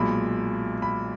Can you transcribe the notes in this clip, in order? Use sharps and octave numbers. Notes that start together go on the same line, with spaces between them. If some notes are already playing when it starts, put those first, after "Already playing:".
Already playing: B1 A#2 G#3 B5
B5